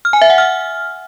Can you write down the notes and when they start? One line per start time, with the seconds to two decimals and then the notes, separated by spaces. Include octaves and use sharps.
0.05 F6
0.13 G#5
0.22 E5
0.30 F#5
0.38 F6